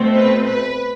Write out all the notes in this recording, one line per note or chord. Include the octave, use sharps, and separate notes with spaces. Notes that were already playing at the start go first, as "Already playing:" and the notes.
Already playing: B2 A3 C4
B4
B4